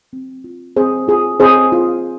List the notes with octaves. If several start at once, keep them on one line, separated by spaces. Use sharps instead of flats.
C4
F4
C4 G#4 C5
F4 G#4
C4 G#4 C5
F4